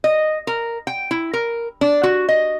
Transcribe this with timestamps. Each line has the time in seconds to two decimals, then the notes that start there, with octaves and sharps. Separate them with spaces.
0.04 D#5
0.47 A#4
0.87 G5
1.11 E4
1.33 A#4
1.81 D4
2.03 F#4
2.29 D#5